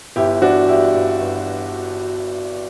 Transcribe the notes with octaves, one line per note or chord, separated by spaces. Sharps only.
G1 E4 G4
E3 D4 F#4
G2 E4 G4
G2
G2